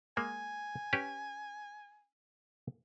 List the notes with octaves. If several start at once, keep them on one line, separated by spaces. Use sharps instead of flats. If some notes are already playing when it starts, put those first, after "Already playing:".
G#3 A#3 G#5
C#4 G4 B4